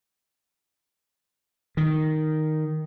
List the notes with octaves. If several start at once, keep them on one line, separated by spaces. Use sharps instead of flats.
D#3